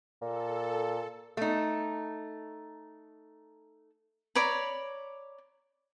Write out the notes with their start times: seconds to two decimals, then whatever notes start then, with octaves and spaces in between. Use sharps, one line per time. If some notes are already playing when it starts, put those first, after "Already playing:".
0.22 A#2 A4
1.37 A3 D#4
4.35 C#5 D5 A#5 B5